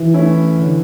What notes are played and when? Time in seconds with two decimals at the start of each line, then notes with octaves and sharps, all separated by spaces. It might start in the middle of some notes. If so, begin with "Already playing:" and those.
Already playing: E3
0.14 A3 C#4 E4
0.58 D3